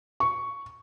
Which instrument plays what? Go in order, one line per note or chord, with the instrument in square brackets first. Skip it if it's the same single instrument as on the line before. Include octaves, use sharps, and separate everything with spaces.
[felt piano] C#6